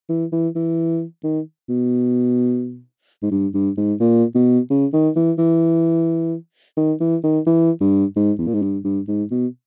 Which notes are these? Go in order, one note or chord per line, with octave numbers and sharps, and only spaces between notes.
E3
E3
E3
D#3
B2
G#2
G2
G2
G#2
A#2
B2
C#3
D#3
E3
E3
D#3
E3
D#3
E3
G2
G#2
E2
A#2
G#2
G2
G2
G#2
B2